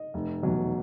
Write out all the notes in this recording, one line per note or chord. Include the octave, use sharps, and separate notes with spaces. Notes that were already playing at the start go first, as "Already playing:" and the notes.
Already playing: D#5
F1
E2 B2 F#3